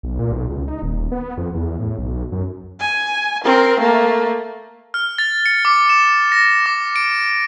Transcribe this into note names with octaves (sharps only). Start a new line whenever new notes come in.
B1
A#2
B1
C#2
D#4
D#1
B3
F2
E2
A2
B1
F#2
G#5
C4 A#4
A3 A#3
F6
A6
C#7
D6
E7
A#6
D6
D7